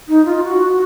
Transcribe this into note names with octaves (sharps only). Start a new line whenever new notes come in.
D#4
F4
F#4